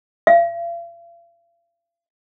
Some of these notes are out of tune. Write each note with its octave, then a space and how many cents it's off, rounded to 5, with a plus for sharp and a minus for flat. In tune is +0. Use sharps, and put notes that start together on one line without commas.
F5 -45